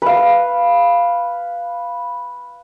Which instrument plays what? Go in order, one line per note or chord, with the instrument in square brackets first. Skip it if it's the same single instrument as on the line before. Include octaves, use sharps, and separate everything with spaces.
[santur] B4 F5